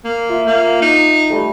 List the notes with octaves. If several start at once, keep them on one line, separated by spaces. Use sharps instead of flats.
A#3
F4 E5
A#3
D#4
G3 A3